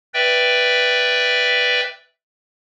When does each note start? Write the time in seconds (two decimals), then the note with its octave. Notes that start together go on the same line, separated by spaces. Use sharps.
0.14 B4 D5 E5 G5